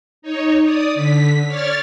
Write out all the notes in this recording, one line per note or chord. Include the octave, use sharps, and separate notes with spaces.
D#4 C#5
D5 D#6
D3 B6
C#5 D5 F6 A6